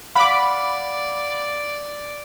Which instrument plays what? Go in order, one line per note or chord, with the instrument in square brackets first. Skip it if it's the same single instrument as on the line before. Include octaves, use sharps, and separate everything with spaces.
[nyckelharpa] D5 [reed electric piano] F5 F#5 [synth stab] B5 D6